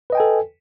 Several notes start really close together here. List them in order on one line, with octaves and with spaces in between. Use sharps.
B4 D#5 G5 G#5 A4